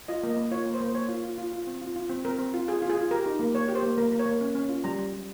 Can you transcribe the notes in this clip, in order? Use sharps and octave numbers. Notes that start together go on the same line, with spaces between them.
F4 D#5
A#3
D#5
A#3
F4 C#5
A#3
C5
A#3
C5
A#3 C#5
F4
F4
F4
F4
C4
F4
F4
C4
C4 A#4
C4
F4
F4 G#4
F4
G#4
F4
G4 A#4
D#4
A#3
A#3 C#5
G4
C5
A#3
A#3 A#4
A#3
C#5
A#3
C#4
C#4
F4
G3 A#5
G3
G3